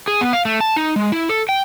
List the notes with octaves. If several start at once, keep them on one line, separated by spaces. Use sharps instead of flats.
G#4
B3
F5
A3
A5
D#4
G#3
E4
A4
G5